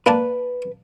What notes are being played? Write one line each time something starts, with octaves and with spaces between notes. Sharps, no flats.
A#3 D4 B4 A5